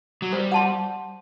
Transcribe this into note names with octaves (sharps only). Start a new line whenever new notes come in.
F#3
G3 C5
F#5 A5 C6